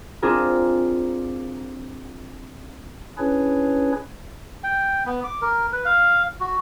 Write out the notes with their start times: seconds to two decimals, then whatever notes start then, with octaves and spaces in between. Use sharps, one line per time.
0.22 C4 D4 F4 G#4 A#4
3.18 C#4 D4 E4 G#4 B4 C#5
4.64 G5
5.06 B3
5.24 D6
5.41 A#4
5.72 B4
5.85 F5
6.40 F#4